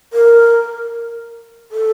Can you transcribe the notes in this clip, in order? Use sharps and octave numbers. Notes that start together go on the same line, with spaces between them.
A#4
A4